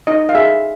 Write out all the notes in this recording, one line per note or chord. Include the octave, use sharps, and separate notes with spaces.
D#4 D#5
F5
G#4 E5